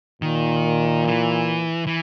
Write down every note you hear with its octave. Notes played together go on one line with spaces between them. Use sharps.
A#2 D#3
E3
E3